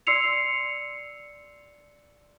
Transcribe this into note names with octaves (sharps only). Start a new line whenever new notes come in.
D5 C6 E6 C7 C#7 F7